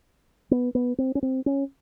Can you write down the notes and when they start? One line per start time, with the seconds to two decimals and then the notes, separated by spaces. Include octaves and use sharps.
0.51 B3
0.75 B3
0.98 C4
1.15 C#4
1.23 C4
1.46 C#4